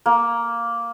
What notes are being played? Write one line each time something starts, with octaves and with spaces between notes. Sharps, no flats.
A#3